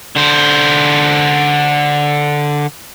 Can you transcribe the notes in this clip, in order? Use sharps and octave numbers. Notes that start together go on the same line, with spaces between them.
D3 C5